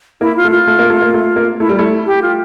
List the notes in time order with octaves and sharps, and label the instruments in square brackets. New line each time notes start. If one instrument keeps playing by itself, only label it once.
[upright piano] A#3 [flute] E4
[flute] F4
[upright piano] A3
[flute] F4
[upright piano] A3
A#3
A3
A#3
A3
A#3
[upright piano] A3 [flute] E4
[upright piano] G3
[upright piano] A3 [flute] E4
[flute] G4
F4